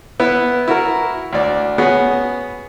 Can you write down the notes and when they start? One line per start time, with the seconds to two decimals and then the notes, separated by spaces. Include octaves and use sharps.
0.20 B3 E4 B4
0.68 E4 F#4 A#4
1.33 D2 D5
1.78 B3 C#4 F#4 G#4